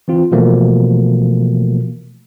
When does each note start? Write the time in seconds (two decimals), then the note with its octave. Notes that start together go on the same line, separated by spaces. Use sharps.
0.08 E3 C4 F4
0.32 B2 E3 F3 A3 A#3